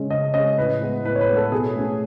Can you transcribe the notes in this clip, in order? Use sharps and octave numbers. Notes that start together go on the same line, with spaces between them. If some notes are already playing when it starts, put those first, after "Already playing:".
Already playing: C#3 G#3 C#4
C#3 D#5
G#3 C#4 D#5
A2 B4
G#3 B3 E4
A2 B4
C#5
B4
G#3 B3 E4
A4
B2 G#4
A3 C#4